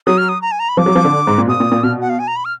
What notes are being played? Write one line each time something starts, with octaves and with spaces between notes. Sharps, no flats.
F#3 D#6
F6
D#6
A#5
G#5
A#5
B5
F3 D6
F#3
F3
D3
G#2
A#2
B2 D#6
A#2
A#2
B2 F6
F#5
F5
G#5
A#5
B5
F6